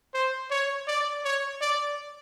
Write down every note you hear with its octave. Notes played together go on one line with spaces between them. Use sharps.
C5
C#5
D5
C#5
D5